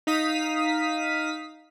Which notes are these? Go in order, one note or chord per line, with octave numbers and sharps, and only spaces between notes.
D#4 F5 D#6 B6